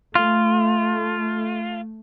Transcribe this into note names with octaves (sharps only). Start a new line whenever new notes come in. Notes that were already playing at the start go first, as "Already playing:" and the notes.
A3 F4